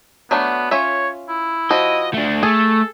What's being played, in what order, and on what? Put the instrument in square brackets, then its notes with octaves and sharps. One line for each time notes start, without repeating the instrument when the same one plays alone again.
[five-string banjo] F#3 A3 D4 [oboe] B3
[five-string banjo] C#4 F4 E5 [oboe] C#5
[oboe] E4
[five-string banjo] F3 F#4 [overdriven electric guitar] D#5
[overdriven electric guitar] A3 D4
[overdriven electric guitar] A3 [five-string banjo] G#4 [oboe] A4